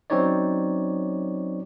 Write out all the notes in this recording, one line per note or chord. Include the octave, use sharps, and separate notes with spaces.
F#3 C4 C#4 D#4 C#5 D5